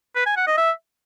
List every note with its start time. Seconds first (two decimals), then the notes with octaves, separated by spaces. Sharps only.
0.16 B4
0.26 G#5
0.37 F#5
0.47 D#5
0.58 E5